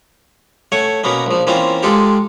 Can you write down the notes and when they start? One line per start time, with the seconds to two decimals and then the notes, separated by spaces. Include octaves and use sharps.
0.72 A3 C#5 F#5 G#5
1.04 B2 A#3 B3 C#4
1.26 A#1 F3
1.47 E3 A#3 C4 C#4 F4
1.83 G#3 F4 G4 A4 G5